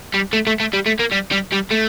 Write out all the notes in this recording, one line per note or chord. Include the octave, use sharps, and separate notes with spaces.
G3
A3
A3
A3
G3
A3
A#3
G3
G3
G3
A3